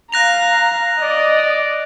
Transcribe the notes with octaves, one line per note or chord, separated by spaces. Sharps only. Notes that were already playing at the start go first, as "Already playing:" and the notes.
F5 A#5 F#6 A#6 F7
D5 D#5